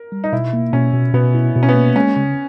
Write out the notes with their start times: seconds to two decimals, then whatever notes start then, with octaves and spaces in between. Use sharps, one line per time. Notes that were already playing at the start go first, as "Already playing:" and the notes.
Already playing: A#4
0.12 G3
0.24 D#4
0.32 B2 E4
0.53 A#3
0.73 B2 C#4
0.93 B2
1.13 B2 B3
1.35 E4
1.55 B2
1.63 C#4
1.69 B3
1.75 A#3
1.95 G#3 C#4
2.16 C#3